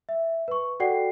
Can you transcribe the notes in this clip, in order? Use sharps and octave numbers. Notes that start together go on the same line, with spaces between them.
E5
B4 C#6
F#4 A4 D5 F#5 G5 C7